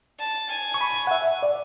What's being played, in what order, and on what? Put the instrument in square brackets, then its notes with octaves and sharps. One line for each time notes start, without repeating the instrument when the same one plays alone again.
[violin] A5
G#5
[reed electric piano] C#6
B5
F#5
E5
D5